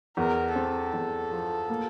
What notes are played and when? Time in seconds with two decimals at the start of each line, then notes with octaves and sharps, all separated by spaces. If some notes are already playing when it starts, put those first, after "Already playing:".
0.17 E2 A#4
0.55 C4 A4
0.93 E2
1.31 F3
1.69 A#3